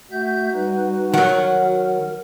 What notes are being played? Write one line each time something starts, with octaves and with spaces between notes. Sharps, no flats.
A3 F#4 E5 G6
G3 D#4 B4
D#3 F#3 A#4 F#5